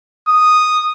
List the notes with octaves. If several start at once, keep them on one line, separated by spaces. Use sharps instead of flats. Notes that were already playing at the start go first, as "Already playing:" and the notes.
D#6